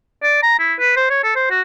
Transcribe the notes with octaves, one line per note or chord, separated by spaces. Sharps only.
D5
A#5
E4
B4
C5
C#5
A4
C5
F#4